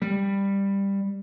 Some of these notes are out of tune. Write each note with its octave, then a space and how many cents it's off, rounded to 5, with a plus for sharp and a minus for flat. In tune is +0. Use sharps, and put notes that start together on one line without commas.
G3 +10